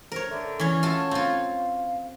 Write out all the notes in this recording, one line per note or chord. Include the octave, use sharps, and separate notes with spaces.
A#4 C5 C#5
D3 E5
E3 C#4 C#5
F4 F#4 A4 A5
C4 F4 F5